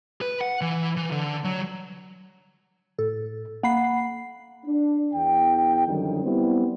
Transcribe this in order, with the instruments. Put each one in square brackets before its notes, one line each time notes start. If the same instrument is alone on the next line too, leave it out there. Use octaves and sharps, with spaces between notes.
[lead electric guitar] B4
F#5
E3
E3
D3
F#3
[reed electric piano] A2 [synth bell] A4
[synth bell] A#3 B5 C7 [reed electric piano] F#5
[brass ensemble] D4
E2 G5
F#2 D3 D#3 F3 G3
G3 B3 C4 E4